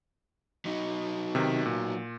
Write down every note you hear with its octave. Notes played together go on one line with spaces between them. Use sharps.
F#3 D#4
C3 D#3
A#2